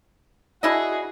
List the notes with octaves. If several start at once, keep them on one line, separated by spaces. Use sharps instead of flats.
D4 E4 F#4 G#4 D#5